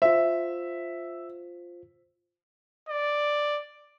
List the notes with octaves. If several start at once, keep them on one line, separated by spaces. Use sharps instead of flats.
F4 C5 E5
D5